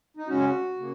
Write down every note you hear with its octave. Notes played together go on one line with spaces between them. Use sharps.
D#4
C#3 G#3 C#4 F#4
C#3 A#3